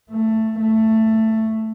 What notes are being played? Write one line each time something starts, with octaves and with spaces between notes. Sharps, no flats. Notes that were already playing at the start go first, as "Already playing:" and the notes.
A3
A3